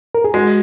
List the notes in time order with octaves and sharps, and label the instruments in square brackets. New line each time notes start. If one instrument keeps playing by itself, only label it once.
[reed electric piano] A#4
G#4
[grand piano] G#3 [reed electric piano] F#4